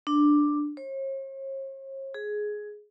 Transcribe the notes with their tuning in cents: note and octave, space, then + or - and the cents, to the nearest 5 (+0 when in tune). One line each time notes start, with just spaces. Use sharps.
D4 +5
C#5 -45
G#4 +10